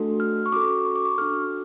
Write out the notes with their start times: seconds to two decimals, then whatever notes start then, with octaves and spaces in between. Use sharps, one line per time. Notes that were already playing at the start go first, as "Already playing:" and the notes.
Already playing: A3 D4 F#4 A4
0.20 F6
0.46 C#6
0.52 C#4 F#4 A4 D6
0.85 C#6
0.96 D6
1.05 C#6
1.18 D4 F#4 A4 F6